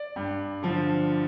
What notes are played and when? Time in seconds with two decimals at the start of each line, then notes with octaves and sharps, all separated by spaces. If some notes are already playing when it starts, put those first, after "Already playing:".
Already playing: D5
0.16 G2
0.63 D3 F3